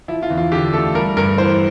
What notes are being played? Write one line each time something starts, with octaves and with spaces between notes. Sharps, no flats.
F3 E4
F4
E2
F4
D3 G4
A3 A4
G3 A#4
G2 A#4
E3 C5